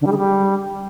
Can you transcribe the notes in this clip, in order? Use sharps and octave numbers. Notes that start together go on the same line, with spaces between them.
D3
G3
G#3
G3